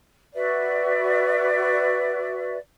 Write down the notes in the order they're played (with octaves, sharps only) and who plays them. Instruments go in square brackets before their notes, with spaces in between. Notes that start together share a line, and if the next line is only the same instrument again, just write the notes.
[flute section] F#4 B4 D5 E5